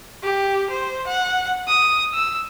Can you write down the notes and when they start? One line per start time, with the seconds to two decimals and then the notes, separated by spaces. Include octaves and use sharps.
0.23 G4
0.70 C5
1.07 F#5
1.68 D#6
2.14 E6